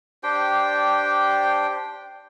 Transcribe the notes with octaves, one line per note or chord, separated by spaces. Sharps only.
D4 G4 C5 G5